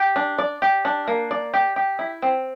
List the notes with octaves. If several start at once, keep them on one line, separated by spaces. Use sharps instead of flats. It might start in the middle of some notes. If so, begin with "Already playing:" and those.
Already playing: G4
D4
D5
G4
D4
A#3
D5
G4
G4
E4
C4